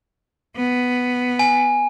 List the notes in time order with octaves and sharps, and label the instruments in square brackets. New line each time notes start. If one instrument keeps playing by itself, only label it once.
[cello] B3
[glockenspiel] G#5